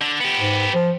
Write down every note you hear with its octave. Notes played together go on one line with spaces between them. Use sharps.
D3
B3 G4
G#2
F3